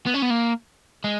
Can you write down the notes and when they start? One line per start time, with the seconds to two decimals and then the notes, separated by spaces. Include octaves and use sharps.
0.06 B3
0.14 C#4
0.22 B3
0.30 A#3
1.04 G#3